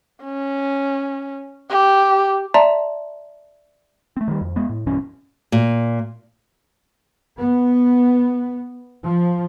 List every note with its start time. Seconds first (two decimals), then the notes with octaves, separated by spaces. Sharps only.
0.24 C#4
1.70 G4
2.54 D5 E5 A5 A#5 C6
4.17 A3 C4
4.28 D#3 G3
4.41 F2
4.56 G#3 B3
4.69 A2
4.86 B1 G2 E3 C#4
5.52 A#2
7.40 B3
9.03 F3